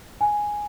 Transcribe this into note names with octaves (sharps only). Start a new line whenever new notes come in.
G#5